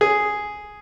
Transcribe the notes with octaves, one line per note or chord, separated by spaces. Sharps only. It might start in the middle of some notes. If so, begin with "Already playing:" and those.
G#4